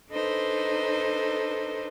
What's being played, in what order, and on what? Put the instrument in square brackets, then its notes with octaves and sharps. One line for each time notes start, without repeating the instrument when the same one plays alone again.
[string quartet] D4 D#4 A4 B4 C5